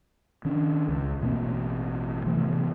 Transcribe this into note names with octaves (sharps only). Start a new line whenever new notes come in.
D#3 C#4 D4
C#2
A1 B2 A#3 C4
C3 E3 A3 B3